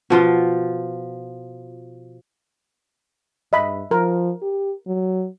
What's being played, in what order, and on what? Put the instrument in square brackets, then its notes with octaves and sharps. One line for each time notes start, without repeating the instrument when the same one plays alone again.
[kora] B2 F3 F4
[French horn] G2 [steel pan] D#5 E5 B5
[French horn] F3 [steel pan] A#4
[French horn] G4
F#3